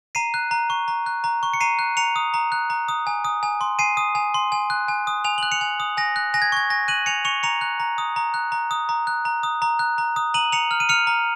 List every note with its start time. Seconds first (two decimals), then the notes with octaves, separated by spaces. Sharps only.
0.15 A#5 C7 D#7
0.34 F#6
0.51 A#5
0.70 C#6
0.88 A#5
1.06 F#6
1.24 A#5
1.43 C#6
1.54 C#7
1.60 A#5 C7 D#7
1.79 F#6
1.97 A#5 C#7 F7
2.16 D#6
2.34 A#5
2.52 F#6
2.70 A#5
2.88 D#6
3.07 G#5
3.25 D#6
3.43 G#5
3.61 C6
3.79 G#5 C7 D#7
3.97 D#6
4.15 G#5
4.34 C6
4.52 G#5
4.70 F#6
4.88 G#5
5.07 D#6
5.25 G#5 F7
5.38 F#6 F#7
5.52 C#7 F7
5.61 G#5
5.80 D#6
5.97 G#5 A#6
6.16 F#6
6.34 G#5 A#6
6.42 G#6
6.52 C#6 G#6
6.70 G#5 A#6
6.88 F#6 D#7 F#7
7.06 G#5 C#7 F7
7.25 C#6 C#7 F7
7.43 A#5 C#7 F7
7.61 F#6
7.80 A#5
7.98 D#6
8.16 A#5
8.34 F#6
8.52 A#5
8.71 D#6
8.89 A#5
9.07 F#6
9.25 A#5
9.43 D#6
9.62 A#5
9.79 F#6
9.98 A#5
10.16 D#6
10.34 A#5 D#7 F#7
10.52 A#5 C#7 F7
10.71 F6
10.80 D#7
10.89 F6 C#7 F7
11.07 A#5